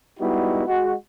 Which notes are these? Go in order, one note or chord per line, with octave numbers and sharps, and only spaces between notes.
G3 G#3 B3 D#4 E4 F#4
G#3 F#4